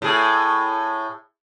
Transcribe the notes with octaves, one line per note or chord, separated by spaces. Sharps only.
A2 G#4